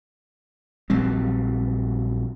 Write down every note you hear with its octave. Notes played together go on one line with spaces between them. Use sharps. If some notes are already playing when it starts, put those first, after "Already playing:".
A#1 F#3 G3 C4